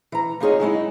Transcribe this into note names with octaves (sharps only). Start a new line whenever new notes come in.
E3 A#5
A#3 D#4 F4 G#4 C#5 D#5
F#3 G#3 D#4 E4